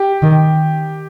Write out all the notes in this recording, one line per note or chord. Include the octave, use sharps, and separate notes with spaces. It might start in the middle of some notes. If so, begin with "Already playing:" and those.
Already playing: G4
D#3